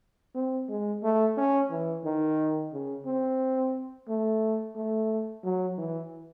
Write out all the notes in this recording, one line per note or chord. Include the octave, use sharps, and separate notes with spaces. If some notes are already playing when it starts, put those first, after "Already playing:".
C4
G#3
A3
C#4
E3
D#3
C#3
C4
A3
A3
F#3
E3